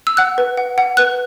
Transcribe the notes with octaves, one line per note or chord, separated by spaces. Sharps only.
E6
F#5 F#6
B4
F#5
F#5
B4 F#6